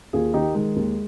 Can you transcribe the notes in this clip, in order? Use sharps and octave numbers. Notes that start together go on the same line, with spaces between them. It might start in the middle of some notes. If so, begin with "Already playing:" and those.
D#2 F4 G#4
D#3 D#4 G4
D#3 G#3
D#2